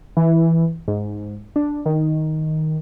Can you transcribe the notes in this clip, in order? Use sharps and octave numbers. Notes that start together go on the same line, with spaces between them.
E3
G#2
D4
D#3